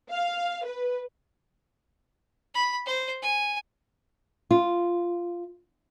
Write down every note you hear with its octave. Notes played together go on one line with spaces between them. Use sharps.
F5
B4
B5
C5
G#5
F4